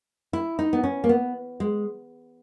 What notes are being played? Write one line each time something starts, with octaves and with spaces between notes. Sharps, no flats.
E4
D#4
B3
C#4
A#3
B3
G#3